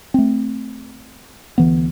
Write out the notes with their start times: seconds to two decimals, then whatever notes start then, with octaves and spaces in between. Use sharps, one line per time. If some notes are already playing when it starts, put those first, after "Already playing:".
0.14 A3 C4
1.58 D2 E3 B3